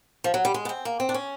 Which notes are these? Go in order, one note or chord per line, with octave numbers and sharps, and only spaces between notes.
F3
F#3
G3
G#3
B3
C4
A#3
C4
D4
C#4